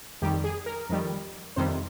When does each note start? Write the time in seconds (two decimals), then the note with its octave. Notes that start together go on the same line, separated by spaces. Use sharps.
0.22 F2 D#3 G3 G4
0.44 G#4
0.66 A#4
0.90 F2 D#3 G3
1.56 F2 C3 D#3 G3 C5